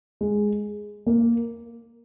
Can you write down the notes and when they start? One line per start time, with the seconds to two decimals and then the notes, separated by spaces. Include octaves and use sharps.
0.21 G#3
1.06 A#3